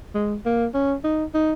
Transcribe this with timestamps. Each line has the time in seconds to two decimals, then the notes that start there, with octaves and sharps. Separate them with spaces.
0.15 G#3
0.46 A#3
0.74 C#4
1.04 D#4
1.34 D#4